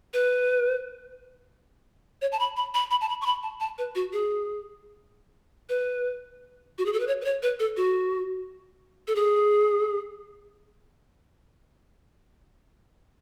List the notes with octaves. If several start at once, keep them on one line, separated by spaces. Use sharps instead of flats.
B4
C#5
A5
B5
B5
B5
B5
A5
B5
C#6
B5
A5
A5
B4
F#4
G#4
B4
F#4
G#4
A4
B4
C#5
B4
C#5
B4
A4
F#4
A4
G#4